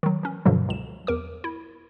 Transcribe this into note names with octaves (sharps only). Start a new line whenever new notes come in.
D#3 F#3
E3 C#4
G2 B2 D3 F3 F#3
C#2 E7
E2 A#4 D6
E4